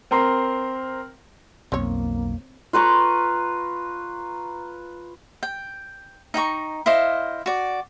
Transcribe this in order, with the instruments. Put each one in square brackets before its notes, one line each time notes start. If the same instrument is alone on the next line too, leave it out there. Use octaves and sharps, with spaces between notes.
[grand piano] C4 A#4 A#5 C6
[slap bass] B1 [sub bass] F2 [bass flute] A#3 [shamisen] C4 C#5
[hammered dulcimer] F4 B4 A#5 C#6
[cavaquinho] G5
D#4 G5 A#5 C#6
E4 C5 D#5 F5
F#4 D5